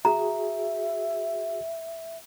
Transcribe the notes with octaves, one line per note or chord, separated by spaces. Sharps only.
F#4 G#4 E5 A#5